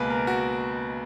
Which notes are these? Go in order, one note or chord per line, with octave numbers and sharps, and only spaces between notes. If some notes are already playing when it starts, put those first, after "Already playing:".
Already playing: C#2 B2 A#3 B4 G#5
A#4
F#4